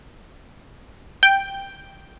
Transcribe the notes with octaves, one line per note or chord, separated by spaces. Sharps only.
G5